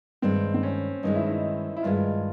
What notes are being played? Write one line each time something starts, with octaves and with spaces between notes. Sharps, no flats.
G2 D#3 G#3 C4
C4
C#4
G2 D#3 G#3 D#4
E4
D#4
E4
G2 D#3 G#3 F4